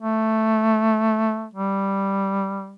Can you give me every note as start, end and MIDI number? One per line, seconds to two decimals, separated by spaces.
0.01 1.48 57
1.54 2.76 55